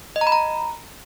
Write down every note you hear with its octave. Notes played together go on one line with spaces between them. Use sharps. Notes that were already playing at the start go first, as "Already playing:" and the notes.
D#5
A#5
B5
A#5